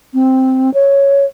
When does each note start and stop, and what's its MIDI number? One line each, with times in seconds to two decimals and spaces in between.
0.14 0.73 60
0.74 1.25 73